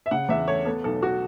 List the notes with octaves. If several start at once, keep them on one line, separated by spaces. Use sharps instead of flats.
E5
C#3 F#5
E2 E5
A3 C#5
B3 A4
B1 A4
F#4